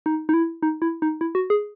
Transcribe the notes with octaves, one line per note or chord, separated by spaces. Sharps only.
D#4
D#4
E4
D#4
E4
D#4
E4
F#4
G#4